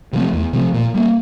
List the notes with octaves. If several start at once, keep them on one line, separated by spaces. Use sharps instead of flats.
C3 F3 A3
E2
C3 F3 A3
A#2
G3 A#3